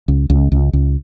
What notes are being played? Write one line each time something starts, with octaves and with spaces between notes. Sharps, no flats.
C#2
C#2
C#2
C#2